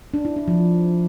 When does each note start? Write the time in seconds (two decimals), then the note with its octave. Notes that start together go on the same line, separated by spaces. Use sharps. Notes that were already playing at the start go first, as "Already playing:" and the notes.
0.14 D4
0.25 E4
0.36 D4
0.48 F3